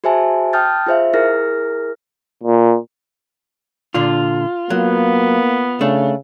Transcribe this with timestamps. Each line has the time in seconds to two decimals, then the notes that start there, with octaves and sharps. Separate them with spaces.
0.04 F#4 G#4 C5 E5 G#5 A5
0.53 G5 A5 D#6 F6 G6 A6
0.87 F4 G#4 C5 E5 F5
1.13 E4 G#4 A#4 F6 A#6
2.44 A#2
3.94 A#2 D3 D4 F4
4.70 F#3 A#3 B3
5.81 C#3 A3 D4